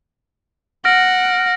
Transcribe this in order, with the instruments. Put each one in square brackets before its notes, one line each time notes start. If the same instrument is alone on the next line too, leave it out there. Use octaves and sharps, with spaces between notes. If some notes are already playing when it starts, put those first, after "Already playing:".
[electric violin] F#5 [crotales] F6 A#6 D7